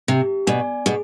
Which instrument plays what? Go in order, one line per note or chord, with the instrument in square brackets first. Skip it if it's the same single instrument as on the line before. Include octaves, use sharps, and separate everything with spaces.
[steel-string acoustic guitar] C3 [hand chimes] G4
[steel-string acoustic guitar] B2 [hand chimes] D5 G#5
[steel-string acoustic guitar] B2 [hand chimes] G#4